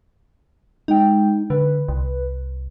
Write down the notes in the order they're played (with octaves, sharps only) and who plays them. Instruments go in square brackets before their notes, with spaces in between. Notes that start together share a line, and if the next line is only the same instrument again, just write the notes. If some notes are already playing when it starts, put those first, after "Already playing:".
[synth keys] G#3 G5 [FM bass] D#4
[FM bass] D3 [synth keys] B4
[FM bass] C2